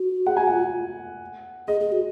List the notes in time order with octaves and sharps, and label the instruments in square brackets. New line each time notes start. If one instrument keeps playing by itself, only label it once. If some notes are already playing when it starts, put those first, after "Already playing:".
Already playing: [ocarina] F#4
[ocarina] G#4 [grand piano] F#5
[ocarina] F#4 [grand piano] G#5
[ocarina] F4 [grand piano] F#5
[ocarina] G#4 [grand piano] D#5
[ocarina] G#4
F#4